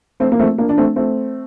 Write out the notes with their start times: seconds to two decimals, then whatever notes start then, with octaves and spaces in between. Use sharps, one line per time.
0.20 A3 C4
0.32 A#3
0.39 A3 C4
0.58 A#3 D4
0.69 D4
0.78 A3 C4
0.96 A3 C4